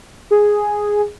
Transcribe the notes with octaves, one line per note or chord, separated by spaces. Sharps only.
G#4